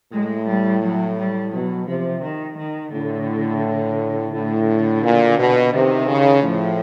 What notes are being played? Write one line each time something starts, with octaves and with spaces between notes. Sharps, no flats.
A2 G#3
G3
F#3
G3
B2 F#3
C3 F3
D#3
D#3
A2 D3
A2 D3
A#2
B2
C3 D#3
C#3
A2 F3